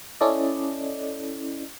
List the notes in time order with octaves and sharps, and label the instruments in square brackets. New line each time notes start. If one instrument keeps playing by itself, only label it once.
[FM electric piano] C#4 E4 A4 D5 D#5